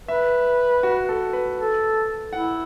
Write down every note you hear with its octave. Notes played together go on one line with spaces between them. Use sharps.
B4 E5
F#4
A4
B4
A4
E4 F#5